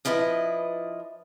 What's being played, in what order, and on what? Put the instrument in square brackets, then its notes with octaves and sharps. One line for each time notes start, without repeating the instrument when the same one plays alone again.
[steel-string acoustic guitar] F3 D4 E4 B4 D#5